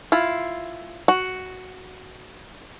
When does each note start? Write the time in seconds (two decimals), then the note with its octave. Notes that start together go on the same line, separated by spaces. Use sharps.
0.12 E4 F4
1.08 F#4